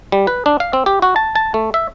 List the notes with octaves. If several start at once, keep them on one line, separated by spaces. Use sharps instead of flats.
G3
B4
D4
F5
C4
G4
F#4
A5
A5
A3
E5